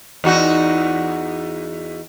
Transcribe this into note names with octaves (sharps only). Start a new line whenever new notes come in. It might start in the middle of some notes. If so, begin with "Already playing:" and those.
E2 D#4 F#4